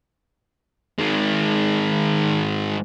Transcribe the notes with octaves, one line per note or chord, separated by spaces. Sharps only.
D#3 G#3